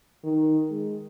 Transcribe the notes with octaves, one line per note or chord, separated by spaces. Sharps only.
D#3
G#3